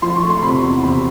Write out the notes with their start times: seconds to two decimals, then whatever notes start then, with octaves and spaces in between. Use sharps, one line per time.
0.02 F3 C6
0.16 C#6
0.23 A3
0.30 C6
0.42 C3 B5
0.63 E2
0.84 C3 B5